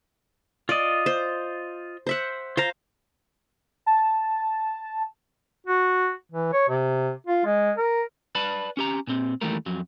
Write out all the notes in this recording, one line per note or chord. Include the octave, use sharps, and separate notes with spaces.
F4 D5 D#5
C5
C5 E5 F#5
F4 C5 F5 A#5
A5
F#4
E3
C#5
C3
F4
G#3
A#4
B4 D5 A5 B5
C#4 G4 A#5
A#2 C4
D#2 E3 G3 A3 A#4
F2 F#3